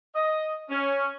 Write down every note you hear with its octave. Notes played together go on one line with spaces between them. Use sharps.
D#5
C#4